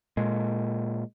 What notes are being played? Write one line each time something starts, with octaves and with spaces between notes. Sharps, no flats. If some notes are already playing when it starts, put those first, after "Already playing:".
A#2 G#3